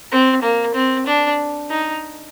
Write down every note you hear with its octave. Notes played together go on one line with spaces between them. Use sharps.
C4
A#3
C4
D4
D#4